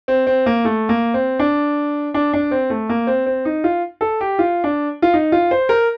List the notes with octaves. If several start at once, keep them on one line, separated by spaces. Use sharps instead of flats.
C4
C4
A#3
A3
A#3
C4
D4
D4
D4
C4
A3
A#3
C4
C4
D#4
F4
A4
G4
F4
D4
F4
D#4
F4
C5
A#4